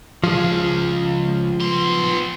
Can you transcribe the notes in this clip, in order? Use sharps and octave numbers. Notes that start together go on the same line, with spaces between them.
C#2 F3 G#4
B3 C6